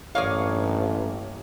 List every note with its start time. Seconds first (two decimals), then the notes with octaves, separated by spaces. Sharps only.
0.15 A1 G2 A#3 C#5 D5 F5 D#6